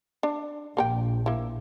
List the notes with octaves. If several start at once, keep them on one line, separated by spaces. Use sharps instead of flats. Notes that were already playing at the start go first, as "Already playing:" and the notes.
D4
A#1 A#3 A#4 G5
A#3 E4